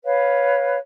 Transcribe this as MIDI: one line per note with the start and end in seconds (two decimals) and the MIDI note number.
0.04 0.77 71
0.04 0.77 73
0.04 0.77 77